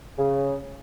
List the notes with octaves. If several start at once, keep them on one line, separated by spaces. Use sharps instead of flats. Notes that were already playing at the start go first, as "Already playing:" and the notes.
C#3